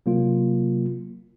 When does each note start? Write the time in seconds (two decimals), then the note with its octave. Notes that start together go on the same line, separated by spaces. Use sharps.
0.06 C3 F#3 A#3 F4